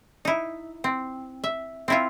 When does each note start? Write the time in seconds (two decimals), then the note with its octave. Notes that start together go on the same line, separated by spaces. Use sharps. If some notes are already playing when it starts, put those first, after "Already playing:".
0.25 D#4 E4
0.84 C4
1.44 E5
1.88 C4 E4 F4